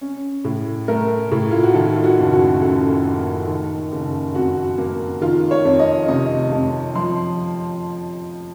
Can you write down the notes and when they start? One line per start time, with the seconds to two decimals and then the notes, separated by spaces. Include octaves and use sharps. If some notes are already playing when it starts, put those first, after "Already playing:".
0.01 C#4
0.44 A2
0.88 A3 A#4
1.32 A2
1.51 F4
1.63 F#4
1.74 D#3 A4
1.96 F4
2.04 F#4
2.18 F#1
2.32 F#4
2.61 F#2 A4
3.05 A#3
3.48 D#3
3.92 F#1
4.35 F2 F#4
4.78 A#3
5.21 D#3 F4
5.51 C#5
5.65 F2
5.79 D#5
6.08 C3 D#5
6.52 F2
6.95 F3 C6